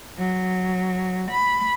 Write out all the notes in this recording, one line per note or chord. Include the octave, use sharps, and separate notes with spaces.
F#3
B5